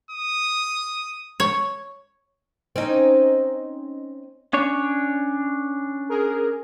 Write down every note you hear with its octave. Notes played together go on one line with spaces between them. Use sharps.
D#6
C#5
C4 C#4 D#4
C#4 D4 C#5
G#4 A#4